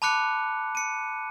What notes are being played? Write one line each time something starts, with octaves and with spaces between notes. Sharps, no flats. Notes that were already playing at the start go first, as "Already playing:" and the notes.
A5 B5 D6 F#6 C#7
C#7 D#7